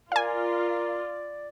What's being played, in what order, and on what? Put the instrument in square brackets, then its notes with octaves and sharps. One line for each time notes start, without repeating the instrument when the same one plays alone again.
[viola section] F4 [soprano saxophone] A#4 [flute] D5 [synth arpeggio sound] F5 G#5